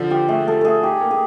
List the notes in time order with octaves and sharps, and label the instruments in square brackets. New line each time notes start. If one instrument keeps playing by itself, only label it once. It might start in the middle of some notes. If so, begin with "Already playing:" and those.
Already playing: [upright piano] D3 F3
[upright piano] F3 [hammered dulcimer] G4
[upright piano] A3 [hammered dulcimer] G#4
[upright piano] F3 [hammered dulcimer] A4
[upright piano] A3 [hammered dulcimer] G#4 A4
[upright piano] D#4 [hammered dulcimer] G4
[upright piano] A#3
[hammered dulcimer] G#4